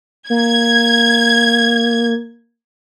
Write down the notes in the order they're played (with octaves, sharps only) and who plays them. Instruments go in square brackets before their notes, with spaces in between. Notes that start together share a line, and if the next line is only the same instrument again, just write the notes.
[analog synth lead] A#3 [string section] G#6